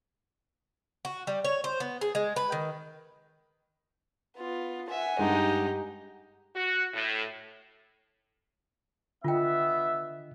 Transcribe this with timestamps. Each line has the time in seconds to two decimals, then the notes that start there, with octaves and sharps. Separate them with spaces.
1.05 F#4
1.27 G3
1.44 C#5
1.64 C5
1.80 B3
2.01 G#4
2.15 G#3
2.36 B4
2.52 D#3
4.38 B3 F4
4.90 E5 F#5 G#5
5.19 G2 G#3 D#4 G4
6.55 F#4
6.93 A2
9.24 D3 B3 F4 D#5 E5 G5